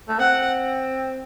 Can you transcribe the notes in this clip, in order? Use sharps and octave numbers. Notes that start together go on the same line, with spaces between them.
A3
C4 F#5